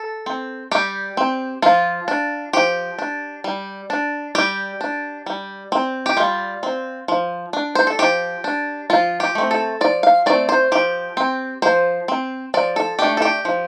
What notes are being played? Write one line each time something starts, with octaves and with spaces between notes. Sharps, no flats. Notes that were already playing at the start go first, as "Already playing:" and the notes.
Already playing: A4
C4
G3 G4
C4
F3 F4
D4
F3 G4
D4
G3
D4
G3 G4
D4
G3
C4
G4
G3 F4
C4
F3
D4
C5
A4
F3 G4
D4
F3 F4
G4
A3 C4
A4
F3 D5
F5
A3 C4 D5
C5
F3 G4
C4
F3 C5
C4
F3 D5
A4
A3 D4 G4
A4
G4
F3